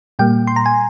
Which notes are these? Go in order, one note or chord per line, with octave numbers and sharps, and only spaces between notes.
A#2 G3 A#3 G5
C6
A#5
G#5